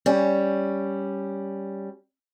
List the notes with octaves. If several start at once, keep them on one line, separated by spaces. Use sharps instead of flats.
G3 C#4